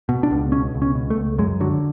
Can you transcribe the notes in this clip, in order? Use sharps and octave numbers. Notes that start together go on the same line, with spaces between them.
B2
D4
C#2
B2 C#4
C#2
C#4
B2
A3
C#2
F#2 G#3
D3 F#3